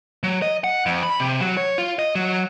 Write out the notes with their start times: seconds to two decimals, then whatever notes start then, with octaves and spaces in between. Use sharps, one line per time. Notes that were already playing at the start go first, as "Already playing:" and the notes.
0.23 F#3
0.42 D#5
0.64 F#5
0.86 F2
1.03 B5
1.20 C3
1.41 F#3
1.57 C#5
1.78 F4
1.99 D#5
2.15 F#3